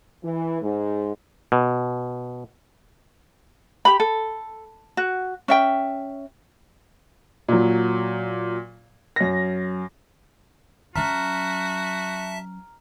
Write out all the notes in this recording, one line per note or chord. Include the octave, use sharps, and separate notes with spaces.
E3
G#2
B2
G4 B5
A4
F#4
C#4 E5 G5
A#2 F#3
F#2 A#6
F#3 C#4 F#4 E5 A5 A#5 F6 B6